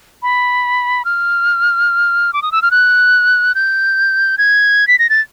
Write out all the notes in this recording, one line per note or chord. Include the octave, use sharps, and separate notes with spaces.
B5
F6
D6
D#6
E6
F6
F#6
G6
G#6
B6
A#6
A6